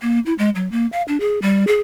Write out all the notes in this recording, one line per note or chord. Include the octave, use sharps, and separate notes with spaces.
A#3
E4
G#3
F#3
A#3
F5
D4
G#4
G3
G#4